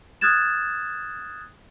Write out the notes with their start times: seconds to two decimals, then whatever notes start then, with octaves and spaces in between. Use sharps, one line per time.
0.21 D#6 F6 F#6 G#6 A6 E7